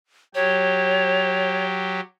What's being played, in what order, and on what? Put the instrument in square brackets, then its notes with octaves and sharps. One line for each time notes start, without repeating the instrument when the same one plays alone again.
[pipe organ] F#3 G4 [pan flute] C#5